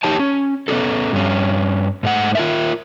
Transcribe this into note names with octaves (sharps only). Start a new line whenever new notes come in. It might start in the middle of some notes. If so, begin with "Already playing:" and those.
D#4 G4 C#5 A5
C#4
B3 C#4 E4 F#4 A4
G2 C#4
G#2 A3 F#5
F4 A#4 E5